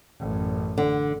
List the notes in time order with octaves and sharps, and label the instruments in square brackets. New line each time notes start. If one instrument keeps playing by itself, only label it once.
[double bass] A1 F#2
[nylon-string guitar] D3